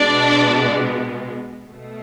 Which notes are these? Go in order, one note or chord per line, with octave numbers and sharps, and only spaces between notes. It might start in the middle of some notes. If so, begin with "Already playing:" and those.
Already playing: B2 G#3 B3 D4 D5
B2 A3